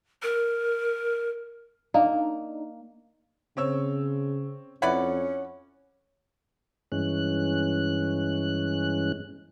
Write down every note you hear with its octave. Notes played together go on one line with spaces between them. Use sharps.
A#4
A#3 D4 D#4
C#3 C4 C#5 E6
F2 C#4 E4 B4 D5 F#5
G2 E3 G#3 C#4 F#6